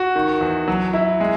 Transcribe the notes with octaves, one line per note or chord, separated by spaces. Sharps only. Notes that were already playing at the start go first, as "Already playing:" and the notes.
Already playing: F#4
D#3
E2
F#3
E4
G#3